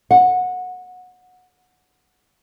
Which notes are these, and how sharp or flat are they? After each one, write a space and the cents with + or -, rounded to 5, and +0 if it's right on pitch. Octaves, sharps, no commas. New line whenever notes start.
F#5 -20